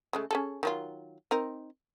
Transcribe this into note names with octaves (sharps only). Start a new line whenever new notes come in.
C#3 G#3 A3
C#4 G#4 A4
D#3 F#3 F4
C4 D#4 A#4